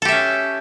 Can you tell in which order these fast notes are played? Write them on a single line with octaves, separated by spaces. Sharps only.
A4 G4 E5 C#4